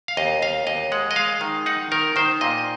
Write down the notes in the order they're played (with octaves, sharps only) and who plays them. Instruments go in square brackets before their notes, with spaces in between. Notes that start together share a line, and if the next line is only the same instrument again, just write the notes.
[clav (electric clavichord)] F5
D#2 D#5
D#2 F5
D#2 D#5
G#3 F#5
D#5
G#3 F5
D#3
D#4 F#5
D#3 A#4
D#3 C5
A#2 D#5